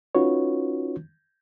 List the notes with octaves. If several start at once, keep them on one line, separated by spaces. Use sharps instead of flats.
C#4 D#4 F4 F#4 B4 C#5